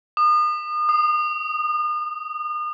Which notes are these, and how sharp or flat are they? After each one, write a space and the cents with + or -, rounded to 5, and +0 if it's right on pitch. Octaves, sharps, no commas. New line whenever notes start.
D#6 -35
D#6 -10